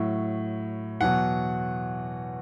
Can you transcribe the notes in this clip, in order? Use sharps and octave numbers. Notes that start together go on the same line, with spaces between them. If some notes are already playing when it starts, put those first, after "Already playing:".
Already playing: A2 F#3
E2 B2 F#3 F#5